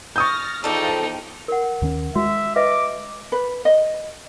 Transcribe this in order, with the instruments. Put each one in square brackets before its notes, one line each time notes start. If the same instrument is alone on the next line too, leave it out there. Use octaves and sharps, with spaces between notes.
[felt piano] C#6 D#6 G6 [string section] F6 A6 A#6
[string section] E2 F3 G5 [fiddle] D#4 [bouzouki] A4 D5
[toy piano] A#4 F#5
[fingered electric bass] D#2 D#3 C#4
[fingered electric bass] G#3 [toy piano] F#4 [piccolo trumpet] E5
[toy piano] B4 D#5 E5 [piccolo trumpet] D6
[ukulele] B4
D#5